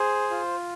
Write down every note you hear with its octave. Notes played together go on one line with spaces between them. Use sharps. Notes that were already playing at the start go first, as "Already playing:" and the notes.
Already playing: G#4 C5
F4